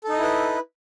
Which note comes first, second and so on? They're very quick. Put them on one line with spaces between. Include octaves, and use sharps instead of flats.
A4 D#4 D#5 E4 B4